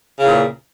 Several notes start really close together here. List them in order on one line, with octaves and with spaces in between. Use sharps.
C#3 E2 A#2